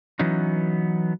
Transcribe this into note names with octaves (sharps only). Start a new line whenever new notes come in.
E3 F#3 B3 C#4 D#4